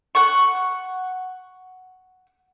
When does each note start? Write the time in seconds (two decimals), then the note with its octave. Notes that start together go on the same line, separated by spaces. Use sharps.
0.15 F#5 C#6